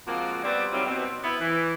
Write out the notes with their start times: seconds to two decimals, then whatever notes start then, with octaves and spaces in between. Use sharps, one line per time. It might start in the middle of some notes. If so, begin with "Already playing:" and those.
0.07 F3 G#3 A#3 C4 F#4
0.44 G3 B3 C4 D5
0.73 D#3 F#3 G3 C4 E4
0.86 B2 C4
1.23 B3 E4 B4
1.40 E3